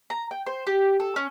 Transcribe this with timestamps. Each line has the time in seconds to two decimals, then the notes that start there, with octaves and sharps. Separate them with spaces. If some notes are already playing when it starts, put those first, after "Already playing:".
0.10 A#5
0.31 G5
0.46 C5
0.67 G4
1.00 A4
1.16 C#4